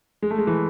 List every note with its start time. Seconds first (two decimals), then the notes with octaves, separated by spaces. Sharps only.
0.22 G#3
0.31 A3
0.38 G#3
0.47 E3